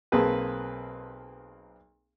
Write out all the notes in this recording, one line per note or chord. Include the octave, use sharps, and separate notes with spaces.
B1 A#3 C4 G#4 B4 A5